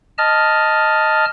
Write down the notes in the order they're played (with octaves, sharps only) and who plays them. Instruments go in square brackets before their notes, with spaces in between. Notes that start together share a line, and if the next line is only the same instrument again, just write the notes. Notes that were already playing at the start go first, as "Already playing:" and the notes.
[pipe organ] D#5 A5 F6